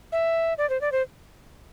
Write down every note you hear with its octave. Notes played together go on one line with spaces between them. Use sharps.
E5
D5
C5
D5
C5